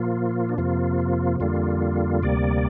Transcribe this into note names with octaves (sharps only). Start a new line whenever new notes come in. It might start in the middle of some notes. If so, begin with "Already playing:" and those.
Already playing: A#2 F3 A#3 F4
D4
F2 C3 F3 A#3 F4
F2 D3 G3 A#3 F4
D2 C3 G3 A#3 D5